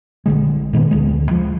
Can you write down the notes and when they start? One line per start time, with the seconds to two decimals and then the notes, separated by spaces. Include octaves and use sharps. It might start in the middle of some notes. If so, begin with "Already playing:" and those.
0.26 A#1 E2 D3 G#3
0.73 A#2 D#3 B3
0.91 D2 G#3
1.31 F3